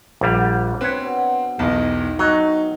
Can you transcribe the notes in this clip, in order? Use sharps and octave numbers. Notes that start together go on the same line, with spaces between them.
A#1 D3 G3
C4 B4 C#5
B2
B1 E2 D#3 D#5 A5
F#3 D#4